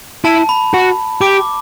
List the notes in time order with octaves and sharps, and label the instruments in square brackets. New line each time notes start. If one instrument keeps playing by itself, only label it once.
[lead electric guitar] E4 [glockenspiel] A5
[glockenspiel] B5
[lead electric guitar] F#4
[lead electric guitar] G4 [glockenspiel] D6